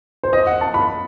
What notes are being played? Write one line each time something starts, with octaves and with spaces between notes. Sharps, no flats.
C5
D#5
F#5
A5
B5